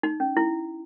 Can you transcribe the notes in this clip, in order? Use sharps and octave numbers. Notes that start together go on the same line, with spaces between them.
D#4
C#4
E4